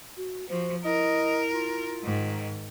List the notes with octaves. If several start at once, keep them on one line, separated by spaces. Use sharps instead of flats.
F#4
F3 F#4 C5
E4 A#4 D#5
F4
G#2 D#3